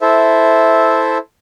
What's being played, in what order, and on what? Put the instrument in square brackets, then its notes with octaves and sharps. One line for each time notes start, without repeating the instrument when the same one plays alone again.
[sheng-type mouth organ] E4 A4 C5 E5